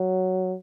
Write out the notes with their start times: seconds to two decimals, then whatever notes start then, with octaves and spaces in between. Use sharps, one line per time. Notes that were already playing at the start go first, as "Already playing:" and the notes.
Already playing: F#3